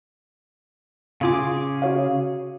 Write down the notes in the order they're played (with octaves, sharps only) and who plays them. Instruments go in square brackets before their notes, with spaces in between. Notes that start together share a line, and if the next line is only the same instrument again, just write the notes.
[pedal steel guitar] C#3 G#4 D6 [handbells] F4 F5
[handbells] F#4 C#5 F5